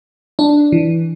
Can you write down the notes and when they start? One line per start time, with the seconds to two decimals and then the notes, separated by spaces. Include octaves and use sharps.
0.39 D4
0.72 E3